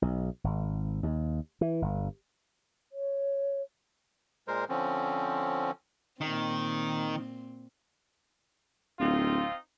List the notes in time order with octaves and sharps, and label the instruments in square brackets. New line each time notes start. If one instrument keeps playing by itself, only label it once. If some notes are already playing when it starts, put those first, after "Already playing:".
[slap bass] B1
G#1
D#2
E3
G1
[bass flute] C#5
[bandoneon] A#2 G#3 A#4 C5
D3 F3 C4 C#4
[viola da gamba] A#2 C4 [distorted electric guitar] D#3
[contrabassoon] D1 [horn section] C4 D#4 F4